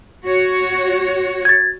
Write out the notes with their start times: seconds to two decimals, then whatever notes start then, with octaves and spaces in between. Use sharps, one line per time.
0.24 F#4 C#5
1.45 G#6 A6